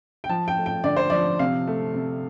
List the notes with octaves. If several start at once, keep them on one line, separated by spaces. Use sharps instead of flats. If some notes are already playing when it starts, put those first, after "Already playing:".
G5
F3 A5
G5
A3
G5
D3 D5
C5
F3 D5
C3 F5
A3
C3